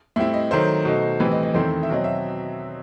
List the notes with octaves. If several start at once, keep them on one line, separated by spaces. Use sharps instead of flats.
A2 G3 C4 E4 E5
D#5
D#3 F#3 A3 C5
B2 A3 D#4
A2 E3 G3 C4 B4
D#5
D#5
E2 D#3 A3 C4 E4 C5
E5
B2 F#3 C4 D#5
E5